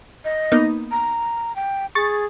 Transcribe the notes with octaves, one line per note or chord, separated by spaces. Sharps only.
D#5
A#3 B3 D#4
A#5
G5
G#4 C#6 A6